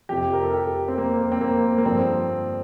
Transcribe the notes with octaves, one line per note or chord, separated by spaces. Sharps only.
F2 C3 F3 G4
A#4
A4
G4
C4
A#3
C4
A#3
A#3
G2 D3 F3 C4